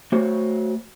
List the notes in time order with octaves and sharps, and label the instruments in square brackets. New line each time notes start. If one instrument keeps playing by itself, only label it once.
[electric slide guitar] A3 F#4 C5 C#5